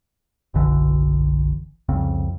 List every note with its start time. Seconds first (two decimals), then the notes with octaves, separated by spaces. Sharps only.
0.54 F#1 B1 D3 E3
1.89 C2 F2 C#3 C4